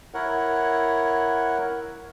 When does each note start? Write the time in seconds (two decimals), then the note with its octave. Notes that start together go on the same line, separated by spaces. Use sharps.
0.14 E4 A#4 C#5 F#5